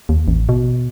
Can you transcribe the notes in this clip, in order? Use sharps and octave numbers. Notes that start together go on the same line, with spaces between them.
D#2
A1
B2